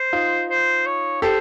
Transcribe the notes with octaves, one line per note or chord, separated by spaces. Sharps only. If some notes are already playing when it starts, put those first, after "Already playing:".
Already playing: C5
D#4 F4
C5
C#5
G4 A4 C5